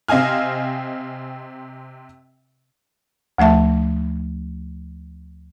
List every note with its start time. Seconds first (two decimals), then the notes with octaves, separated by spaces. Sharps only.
0.08 C3 C4 D#5 F5 G#5 F6
3.38 D2 F3 A3 E5 A5